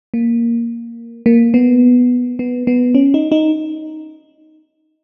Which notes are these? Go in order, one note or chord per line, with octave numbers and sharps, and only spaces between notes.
A#3
A#3
B3
B3
B3
C#4
D#4
D#4